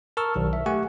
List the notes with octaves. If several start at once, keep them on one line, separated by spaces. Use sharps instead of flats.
A#4 A5 C#6 E6 F6
B1 D#3
E5
A3 G4 F#5 G#5 C#6